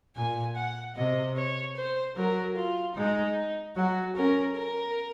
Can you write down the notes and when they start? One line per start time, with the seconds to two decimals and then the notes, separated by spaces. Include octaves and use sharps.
0.16 A#2 G#5
0.56 F#5
0.96 C3 D#5
1.36 C#5
1.76 C5
2.16 F#3 A#4
2.56 F4
2.96 G#3 D#4
3.76 F#3 F#4
4.16 C#4 A#4
4.56 A#4